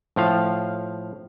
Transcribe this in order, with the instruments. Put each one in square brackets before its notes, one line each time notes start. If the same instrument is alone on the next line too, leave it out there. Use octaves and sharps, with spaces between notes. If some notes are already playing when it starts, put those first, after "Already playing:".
[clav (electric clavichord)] A2 F3 F5